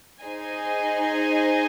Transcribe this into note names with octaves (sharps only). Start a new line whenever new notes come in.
D#4 G#4 C5 D#5 G#5